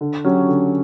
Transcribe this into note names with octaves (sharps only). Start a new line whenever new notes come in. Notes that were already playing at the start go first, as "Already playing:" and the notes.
D3
F#3 C#4 G4
D3